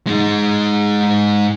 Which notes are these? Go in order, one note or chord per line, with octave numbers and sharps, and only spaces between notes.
G#3 D#4